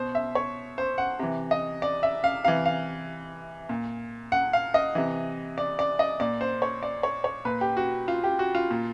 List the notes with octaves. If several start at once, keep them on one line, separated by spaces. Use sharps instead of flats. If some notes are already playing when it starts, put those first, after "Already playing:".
Already playing: B2 C5
E5
C#5
C5
F#5
C3 E3
D#5
D5
E5
F5
C3 E3 F5
F5
A#2
F#5
F5
D#5
C3 E3
D5
D5
D#5
A#2 D5
C5
C#5
D5
C#5
C#5
A#2 B4
G4
F#4
F4
G4
F#4
F4
A#2